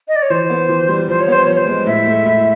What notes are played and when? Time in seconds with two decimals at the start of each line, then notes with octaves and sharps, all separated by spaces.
0.08 D#5
0.15 D5
0.22 C#5
0.30 E3 C5
0.50 B3
0.69 E3
0.88 G3
1.08 F3 C5
1.20 C#5
1.28 B3 C5
1.44 F3 C#5
1.56 C5
1.67 G#3
1.86 A2 E5
2.06 A3
2.26 A2